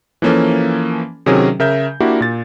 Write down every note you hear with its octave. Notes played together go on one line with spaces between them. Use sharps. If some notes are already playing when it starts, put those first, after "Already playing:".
E3 F3 A#3 C#4 A4
C3 D#3 F#3 C#4 G#4 A#4
C#3 A#4 E5 G6
A#3 D4 E4 F#4 G4
A#2 A6